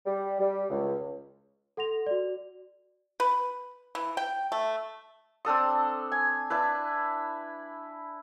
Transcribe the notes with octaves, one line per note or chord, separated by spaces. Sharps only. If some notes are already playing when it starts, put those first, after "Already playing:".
G3
G3
C#2
A4 F#5 C6 A#6 F7
F#4 D5
B4
E3
G5
A3
C4 D4 A4 D#6
G#5
D4 E4 B4